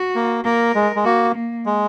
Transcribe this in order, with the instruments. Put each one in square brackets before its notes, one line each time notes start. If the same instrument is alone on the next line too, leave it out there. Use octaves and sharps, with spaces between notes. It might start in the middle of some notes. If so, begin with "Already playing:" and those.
Already playing: [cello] F#4
[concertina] A#3
[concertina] A#3 [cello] A#4
[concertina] G#3
G#3
[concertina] A#3 [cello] F#4
[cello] A#3
[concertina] G#3